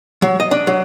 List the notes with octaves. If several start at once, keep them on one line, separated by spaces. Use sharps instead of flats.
F#3
D#5
D4
F#3